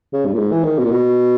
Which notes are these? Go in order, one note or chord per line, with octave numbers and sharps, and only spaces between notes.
C#3
G2
A#2
G#2
E3
D#3
B2
A#2
B2